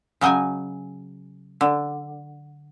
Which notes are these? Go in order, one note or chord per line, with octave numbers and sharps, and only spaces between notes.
C#3 F#3 D#5 G5 G#5
D3